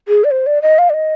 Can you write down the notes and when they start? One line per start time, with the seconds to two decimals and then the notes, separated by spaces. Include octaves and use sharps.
0.08 G#4
0.24 D5
0.31 C5
0.46 D5
0.62 D#5
0.78 F5
0.90 D5
0.94 D#5